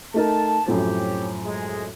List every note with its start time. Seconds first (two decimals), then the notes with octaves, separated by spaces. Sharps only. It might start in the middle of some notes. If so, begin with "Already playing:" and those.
0.14 A3 D#4 A#4 A5
0.66 F#2 A2 F3 C4 C#4 G4
1.45 G#3